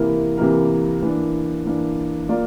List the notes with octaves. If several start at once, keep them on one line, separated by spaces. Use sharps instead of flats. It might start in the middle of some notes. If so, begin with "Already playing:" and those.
Already playing: C3 E3 A#3 E4 A#4
C3 E3 A#3 E4 A#4
E3 A#3 D4
E3 A#3 D4
A#3 F4 A#4 D5